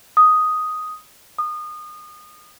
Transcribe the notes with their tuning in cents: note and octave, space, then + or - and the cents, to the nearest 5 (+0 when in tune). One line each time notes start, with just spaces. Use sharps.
D#6 +0
D#6 -30